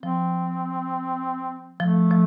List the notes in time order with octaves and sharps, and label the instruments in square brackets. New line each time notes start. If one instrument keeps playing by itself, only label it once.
[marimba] F3 [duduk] C4
[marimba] F3 [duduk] A3
[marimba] F3